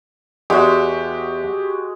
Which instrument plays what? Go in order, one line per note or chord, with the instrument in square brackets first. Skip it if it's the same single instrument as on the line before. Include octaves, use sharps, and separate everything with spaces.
[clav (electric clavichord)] E2 [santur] G#3 F#4 [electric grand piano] G4